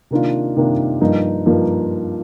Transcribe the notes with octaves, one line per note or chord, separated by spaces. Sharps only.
C3 D#3 A#3 D4 F4
C3 D#3 A#3 D4 F4
G2 F3 A#3 D#4
G2 F3 A#3 D#4